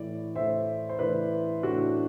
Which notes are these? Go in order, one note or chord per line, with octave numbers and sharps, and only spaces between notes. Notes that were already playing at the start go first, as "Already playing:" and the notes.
Already playing: A2 E3 D5
A2 E3 C5 E5
C5
A2 E3 B4 D5
A2 E3 D4 F#4